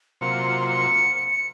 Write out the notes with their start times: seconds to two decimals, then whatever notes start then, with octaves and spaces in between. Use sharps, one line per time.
0.21 C3 F#3 A#3 F4 C5 C#7
0.68 C#7
1.16 C#7
1.31 C#7